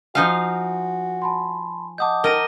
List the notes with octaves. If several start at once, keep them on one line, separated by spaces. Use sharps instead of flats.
F3 D#4 F#4 F5 G#5
A5 B5 C6
D#5 F#5 A5 D6 D#6 G6
D#3 A#4 A#6 D#7 G7